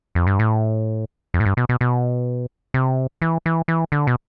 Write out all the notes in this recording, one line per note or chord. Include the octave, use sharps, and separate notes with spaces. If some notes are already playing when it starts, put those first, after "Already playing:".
F2
G2
A2
F2
A2
G2
B2
B2
B2
C3
E3
E3
E3
D3
B2